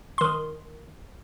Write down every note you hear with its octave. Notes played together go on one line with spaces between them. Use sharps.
D#3 C6